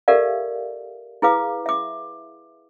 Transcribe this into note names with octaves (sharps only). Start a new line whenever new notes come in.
G4 A4 A#4 D5 E5 F5
E4 G#4 B4 F5 D6
E5 D6